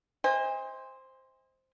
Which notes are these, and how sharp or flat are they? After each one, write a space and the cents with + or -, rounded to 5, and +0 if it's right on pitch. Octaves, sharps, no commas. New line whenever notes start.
C5 +0 D#5 +30 G#5 -40